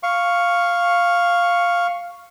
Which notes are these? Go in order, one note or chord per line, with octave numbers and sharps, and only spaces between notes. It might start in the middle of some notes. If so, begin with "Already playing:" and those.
F5 C#6